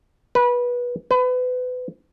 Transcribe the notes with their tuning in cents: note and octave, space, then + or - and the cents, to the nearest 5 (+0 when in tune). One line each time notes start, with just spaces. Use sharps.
B4 -20
B4 +30